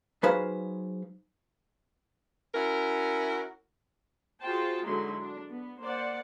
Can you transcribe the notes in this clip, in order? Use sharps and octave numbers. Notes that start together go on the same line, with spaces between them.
F#3 D#4 G#4 B4 C5 F5
C#4 E4 F#4 A#4
F4 F#4 G#4 C5 G5 A5
D3 F#3 G#3 D#4 E4 C6
D4
B3
A#3 C5 D5 F#5